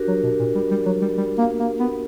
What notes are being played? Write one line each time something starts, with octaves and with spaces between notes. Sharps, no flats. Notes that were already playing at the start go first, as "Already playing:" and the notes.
Already playing: D4 F#4 G4 A#4
F#3
B2
A#2
G3
G3
F#3
G3
G3
A#3
A#3
B3